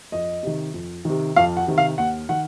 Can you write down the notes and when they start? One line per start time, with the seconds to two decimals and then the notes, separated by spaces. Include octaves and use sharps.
0.12 F2 D#5
0.43 C3 D#3
0.74 F2
1.05 C3 D#3
1.36 F2 F5
1.57 F#5
1.67 C3 D#3
1.78 F5
1.98 D#2 F#5
2.29 D#3 F#5